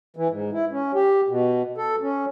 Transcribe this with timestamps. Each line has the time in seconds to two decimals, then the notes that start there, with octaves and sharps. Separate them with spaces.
0.17 E3
0.29 G#2
0.53 E4
0.72 C#4
0.94 G4
1.28 B2
1.78 A4
2.01 C#4